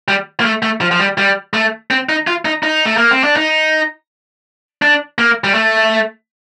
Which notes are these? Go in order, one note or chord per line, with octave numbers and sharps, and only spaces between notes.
G3
A#3
A3
A3
F3
F3
G3
G3
A3
C4
D#4
F4
D#4
D#4
A3
A#3
C4
D4
D#4
D4
A#3
G3
A3